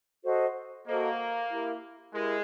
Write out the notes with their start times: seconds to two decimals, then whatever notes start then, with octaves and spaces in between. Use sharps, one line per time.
0.24 F#4 A4 C5 D#5
0.87 A#3 F#4 A4 C5 D#5
1.49 E4 G4 A#4
2.13 G#3 E4 G4 A#4